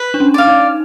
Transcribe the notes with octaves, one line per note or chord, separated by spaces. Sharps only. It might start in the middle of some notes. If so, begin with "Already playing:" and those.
Already playing: B4
D4
C#4
D5 F5
D#4